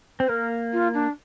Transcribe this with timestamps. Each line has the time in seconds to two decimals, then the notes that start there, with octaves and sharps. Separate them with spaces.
0.20 C4 C5
0.29 A#3 A#4
0.73 F4
0.94 D4